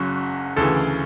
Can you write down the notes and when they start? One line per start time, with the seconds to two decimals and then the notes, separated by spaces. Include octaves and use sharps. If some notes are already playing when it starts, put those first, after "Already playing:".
Already playing: F#1 F#2 C#3 F#4
0.57 D2 C#3 E3 A4